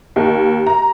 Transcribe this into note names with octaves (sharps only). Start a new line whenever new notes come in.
D#2
A#5